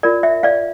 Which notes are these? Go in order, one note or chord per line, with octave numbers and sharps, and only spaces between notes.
F4 A#4 D5
E5
D5 F5